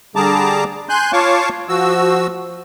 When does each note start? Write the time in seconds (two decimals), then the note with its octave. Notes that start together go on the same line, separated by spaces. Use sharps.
0.16 D3 G3 G#4 A5 A#5 D6
0.89 G#5 C6 F#6 G6
1.13 F4 C#5 F5 A5 C#6 D6
1.69 F3 F#4 E6